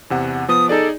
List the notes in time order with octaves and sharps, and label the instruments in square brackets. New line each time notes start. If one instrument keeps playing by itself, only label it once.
[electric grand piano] E2 C3 F#5
[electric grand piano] F3 B3 [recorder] D#6
[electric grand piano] D#4 G#4 D5 [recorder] A4